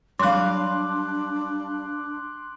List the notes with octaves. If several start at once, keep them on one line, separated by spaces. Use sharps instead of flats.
F#3 G3 D4 F5 C6 D6 F#6